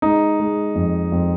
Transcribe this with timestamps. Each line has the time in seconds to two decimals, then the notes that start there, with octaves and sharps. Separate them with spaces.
0.02 G#3 D#4
0.40 G#3
0.75 F2
1.12 F2